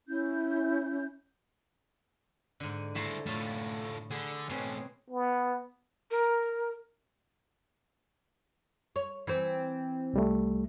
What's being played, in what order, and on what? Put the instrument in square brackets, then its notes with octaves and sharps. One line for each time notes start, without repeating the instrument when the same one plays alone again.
[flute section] C#4 E4 G6
[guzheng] G#2 D3
[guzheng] A3 A5 A#5 [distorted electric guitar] E4 C5
[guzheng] A2 A5 [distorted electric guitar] A3 F4
[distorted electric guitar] D3 [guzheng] G#4 B5
[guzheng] B2 C4 G#4 [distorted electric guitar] A3 C#4
[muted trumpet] B3
[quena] A#4
[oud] C#5
E3 C4
[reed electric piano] C2 G3 A3